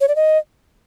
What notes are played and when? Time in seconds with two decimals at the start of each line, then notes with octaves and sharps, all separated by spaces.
0.01 C#5
0.08 D5
0.16 D#5